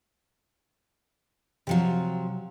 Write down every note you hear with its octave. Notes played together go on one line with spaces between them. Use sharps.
C3 F3 F#3